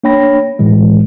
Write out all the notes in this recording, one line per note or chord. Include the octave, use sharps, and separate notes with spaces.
A#3 D4 C#5 G5 B5 A#6
A2 E3 G#3